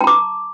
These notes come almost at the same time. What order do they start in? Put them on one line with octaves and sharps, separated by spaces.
A5 A#5 D6